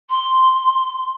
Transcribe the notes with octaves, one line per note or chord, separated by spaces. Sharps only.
C6